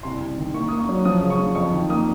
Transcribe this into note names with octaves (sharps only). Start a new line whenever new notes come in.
C2 C6
C2
D#3
A#3 C#6
A#3 D#6
C#6
F#3
F3 D#6
C#3
C#6
F3
F2 C#6
D#3
A#3 D#6